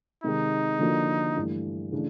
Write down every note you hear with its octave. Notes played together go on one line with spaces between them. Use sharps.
C3 D#3 G#3 D#4
D3 F3 A#3 D4 F#4
G2 E3 A3
C#3 E3 A3 D4